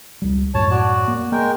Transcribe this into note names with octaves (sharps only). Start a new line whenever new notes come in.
C#2 G3
F#2 A2 C#5 A5
F#4 D5
A#3
G#3 A#3 A#4 G5